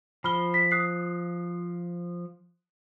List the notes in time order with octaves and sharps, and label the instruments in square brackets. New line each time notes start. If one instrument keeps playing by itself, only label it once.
[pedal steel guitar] F3 [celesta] B5 F6 G7
[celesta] B6
D#6 F#6 C7